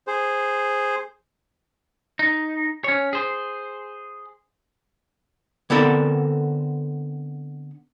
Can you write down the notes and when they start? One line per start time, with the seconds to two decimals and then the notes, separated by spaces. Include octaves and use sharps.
0.07 G#4 C5
2.19 D#4
2.84 C#4 C#5
3.13 G#4 C5
5.70 D3 B3 C4 A4 A#4